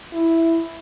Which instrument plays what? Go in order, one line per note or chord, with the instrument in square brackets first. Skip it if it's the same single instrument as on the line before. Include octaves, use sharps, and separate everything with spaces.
[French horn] E4